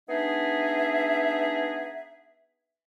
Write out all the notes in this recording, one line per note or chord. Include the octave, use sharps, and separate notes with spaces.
B3 D4 D#4 G#4 E5